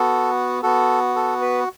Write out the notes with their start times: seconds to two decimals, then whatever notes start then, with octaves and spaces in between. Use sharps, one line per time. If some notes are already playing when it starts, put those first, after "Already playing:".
Already playing: B3 F#4 A4
0.63 B3 F#4 A4
1.16 A4
1.41 B4